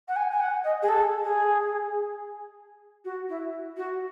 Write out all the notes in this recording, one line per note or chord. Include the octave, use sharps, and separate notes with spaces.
F#5
G#5
G#5
F#5
D#5
G#4
A4
G#4
F#4
E4
F#4